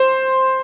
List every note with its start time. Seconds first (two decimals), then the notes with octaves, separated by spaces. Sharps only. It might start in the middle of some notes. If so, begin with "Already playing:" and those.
Already playing: C5